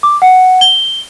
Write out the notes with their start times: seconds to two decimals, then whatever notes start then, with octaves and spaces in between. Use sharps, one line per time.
0.03 D6
0.22 F#5
0.61 G7